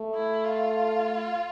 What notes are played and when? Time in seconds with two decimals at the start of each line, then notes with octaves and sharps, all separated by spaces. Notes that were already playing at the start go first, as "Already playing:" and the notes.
Already playing: A3
0.15 E4
0.45 F4